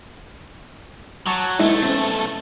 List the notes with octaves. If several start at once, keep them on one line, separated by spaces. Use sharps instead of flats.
F#3 A5 C#6 D6
B1 G#3 A3 D#4 E4
C4 C#4